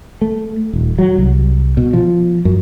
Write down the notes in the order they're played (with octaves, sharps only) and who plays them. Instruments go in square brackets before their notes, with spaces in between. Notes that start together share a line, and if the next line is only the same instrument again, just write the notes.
[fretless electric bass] A3
D#1
F#3
C2
B2
F3
F#2